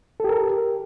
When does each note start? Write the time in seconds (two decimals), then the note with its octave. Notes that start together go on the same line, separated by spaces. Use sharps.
0.20 A4
0.24 G4
0.29 A#4